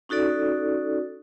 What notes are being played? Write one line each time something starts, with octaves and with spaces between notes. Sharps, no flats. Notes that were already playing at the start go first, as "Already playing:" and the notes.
C#4 D#4 F#4 A4 D5